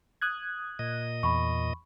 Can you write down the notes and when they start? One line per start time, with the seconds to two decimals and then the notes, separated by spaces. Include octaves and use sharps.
0.22 D#6 F#6 G#6
0.79 A#2 D#5
1.23 E2 B5 C#6